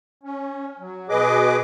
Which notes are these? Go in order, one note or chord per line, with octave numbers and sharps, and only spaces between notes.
C#4
F#3
B2 G#4 B4 D#5 D6